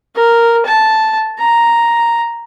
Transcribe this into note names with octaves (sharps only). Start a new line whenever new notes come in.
A#4
A5
A#5